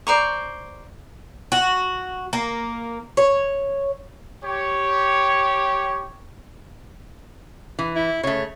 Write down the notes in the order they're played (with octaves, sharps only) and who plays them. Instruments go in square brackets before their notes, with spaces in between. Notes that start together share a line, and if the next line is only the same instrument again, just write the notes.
[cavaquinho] C5 D5 A#5 C#6
[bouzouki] F#4
A#3
C#5
[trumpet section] G4 C#5
[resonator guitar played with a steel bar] E3
[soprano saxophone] E4
[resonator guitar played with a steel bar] C#3 A3 [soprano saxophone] C#5